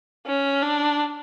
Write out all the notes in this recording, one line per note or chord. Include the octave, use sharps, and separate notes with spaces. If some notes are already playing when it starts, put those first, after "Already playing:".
C#4
D4